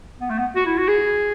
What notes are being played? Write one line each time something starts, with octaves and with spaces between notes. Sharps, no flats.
B3
A3
B3
F#4
E4
F#4
G#4